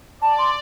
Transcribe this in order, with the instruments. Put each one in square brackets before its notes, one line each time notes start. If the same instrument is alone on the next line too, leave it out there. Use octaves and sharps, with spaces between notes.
[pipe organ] D5 [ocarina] A5
[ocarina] C6